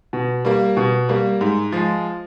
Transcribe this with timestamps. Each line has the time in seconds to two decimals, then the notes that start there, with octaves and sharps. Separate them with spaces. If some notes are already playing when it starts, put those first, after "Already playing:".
0.13 B2
0.45 G3 A#3
0.77 B2
1.09 G3 A#3
1.41 G#2
1.72 F3 G#3